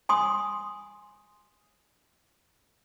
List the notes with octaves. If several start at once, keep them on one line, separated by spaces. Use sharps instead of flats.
G#5 C6 D#6